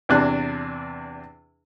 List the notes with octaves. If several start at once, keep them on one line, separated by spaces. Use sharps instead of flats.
E2 C3 D4 F#6